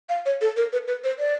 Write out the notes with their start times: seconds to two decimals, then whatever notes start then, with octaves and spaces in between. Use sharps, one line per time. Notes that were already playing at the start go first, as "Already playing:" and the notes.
0.09 F5
0.26 C#5
0.41 A4
0.56 A#4
0.73 B4
0.88 B4
1.04 C5
1.19 D5